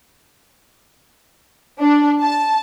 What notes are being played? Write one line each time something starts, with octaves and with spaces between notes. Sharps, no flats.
D4
A5